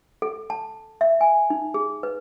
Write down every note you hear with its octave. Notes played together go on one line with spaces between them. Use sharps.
A4
A5
E5
G#5
D#4
G#4
B4